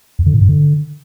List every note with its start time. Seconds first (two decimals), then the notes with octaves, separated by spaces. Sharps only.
0.19 E2
0.26 D3
0.34 A2
0.41 G2
0.48 D3